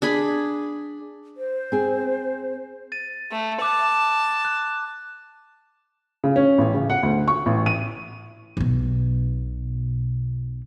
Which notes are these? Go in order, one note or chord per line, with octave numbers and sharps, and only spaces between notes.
D4 G#4 B5
C5
C4 G#4
A6 D#7
A3
A5 D6 F#6
F#6
C#3
C#4
A1
C#3
F#5
D2
C#6
A1
D#7
B1 B2